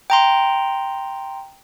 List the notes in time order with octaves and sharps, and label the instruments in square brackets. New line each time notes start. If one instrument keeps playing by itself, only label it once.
[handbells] G5 A#5 C6